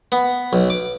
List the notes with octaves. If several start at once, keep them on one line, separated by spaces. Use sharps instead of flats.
B3
B1
D6